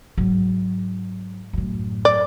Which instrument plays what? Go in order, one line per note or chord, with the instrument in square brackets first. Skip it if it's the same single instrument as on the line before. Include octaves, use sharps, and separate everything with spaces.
[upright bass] G#2 F#3
F#2 A2
[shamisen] D5